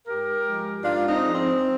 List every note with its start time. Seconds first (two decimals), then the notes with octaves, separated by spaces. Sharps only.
0.07 G#2 G4 A#4
0.46 F3 G#3
0.83 G#2 D4 F4
1.08 C4 D#4
1.21 F3 G#3
1.34 C4